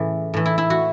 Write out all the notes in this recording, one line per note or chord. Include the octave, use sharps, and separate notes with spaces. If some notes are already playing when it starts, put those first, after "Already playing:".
Already playing: A2 C#3 E3
A2 E3
E4
E4
F#4